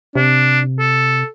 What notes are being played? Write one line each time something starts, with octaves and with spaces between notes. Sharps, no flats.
C3 D4
A4